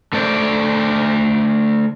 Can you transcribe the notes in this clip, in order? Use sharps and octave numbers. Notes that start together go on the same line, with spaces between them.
D3 A3 C5 D5